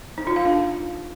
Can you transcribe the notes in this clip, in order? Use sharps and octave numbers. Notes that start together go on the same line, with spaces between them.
D#4
F4
F5
D4